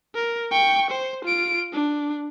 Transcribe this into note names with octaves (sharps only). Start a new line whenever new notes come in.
A#4
G5 C#6
C5
F4 D7
D4